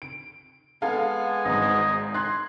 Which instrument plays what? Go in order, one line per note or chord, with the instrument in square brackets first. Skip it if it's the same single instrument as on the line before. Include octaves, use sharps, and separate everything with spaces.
[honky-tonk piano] D7
[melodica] G#3 B3 G#5 [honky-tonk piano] A4 F5
[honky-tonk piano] G#1 G#2 [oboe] D#5
[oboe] C6 [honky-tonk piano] F#6 G#6